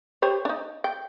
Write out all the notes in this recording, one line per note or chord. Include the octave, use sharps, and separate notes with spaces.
G4 C5 C#5
D4 D#4
G5